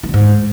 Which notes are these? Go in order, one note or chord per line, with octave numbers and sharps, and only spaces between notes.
E3
D3
G#2